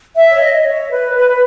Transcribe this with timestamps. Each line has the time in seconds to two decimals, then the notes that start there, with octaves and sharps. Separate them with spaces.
0.16 E5
0.30 C#5
0.40 D#5
0.66 C#5
0.91 B4
1.15 B4